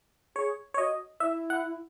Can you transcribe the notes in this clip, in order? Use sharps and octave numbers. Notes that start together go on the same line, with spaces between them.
G#4 C#5
C#5
F#4 D#5
E4 E5
F#5